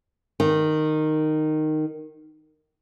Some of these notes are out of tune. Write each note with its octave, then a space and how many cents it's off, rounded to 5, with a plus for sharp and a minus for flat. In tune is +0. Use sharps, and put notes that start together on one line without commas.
D#3 -10